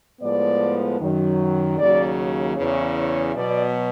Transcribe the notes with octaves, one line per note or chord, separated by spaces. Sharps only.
A2 F3 G#3 B3 D5
F#2 D#3 F#3
D#2 C#3 F#3 D5
E2 C#3 E3 C#5
C#5
B2 F#3 B3 D5